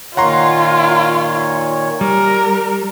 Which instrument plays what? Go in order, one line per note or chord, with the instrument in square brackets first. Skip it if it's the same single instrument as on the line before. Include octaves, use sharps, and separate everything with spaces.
[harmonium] A#2 D#3 C#5 [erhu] F4 [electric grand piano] F#5 A#5 C6
[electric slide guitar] G3 [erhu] A#4